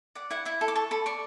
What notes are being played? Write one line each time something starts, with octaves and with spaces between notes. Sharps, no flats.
D5 F#5
E4 F#5
E4 E5
A4
D6
A4 C#6
A4 B5
D5 C#6